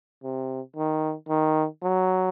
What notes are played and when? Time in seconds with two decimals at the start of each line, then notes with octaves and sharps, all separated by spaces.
0.23 C3
0.76 D#3
1.29 D#3
1.83 F#3